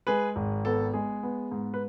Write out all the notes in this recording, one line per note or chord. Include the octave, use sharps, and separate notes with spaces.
G#3 G#4 B4
G#1
B3 A4
G#3 G#4
B3
G#2
B4